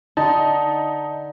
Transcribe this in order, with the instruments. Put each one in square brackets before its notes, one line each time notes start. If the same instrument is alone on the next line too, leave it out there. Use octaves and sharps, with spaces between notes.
[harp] D3 [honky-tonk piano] D#4 [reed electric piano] A5